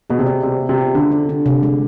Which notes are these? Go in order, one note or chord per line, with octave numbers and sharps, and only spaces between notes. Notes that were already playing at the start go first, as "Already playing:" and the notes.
B2 G#4
C3
D5
C3 G#4
B3
C3
F4
D3 D4
D4
D4
C3
G#3